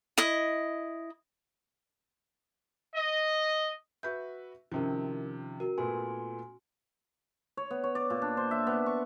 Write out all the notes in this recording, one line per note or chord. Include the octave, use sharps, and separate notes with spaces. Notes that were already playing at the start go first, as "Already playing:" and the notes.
E4 D#5
D#5
F#4 B4 E5 G6
C3 D#3 F3 C#4 E4 A#4
F#4 A#4
A#2 A3 B3 G#5 C6
C#5
B3
C#5
D5
A#2
D4
C5
E5
B3
C#6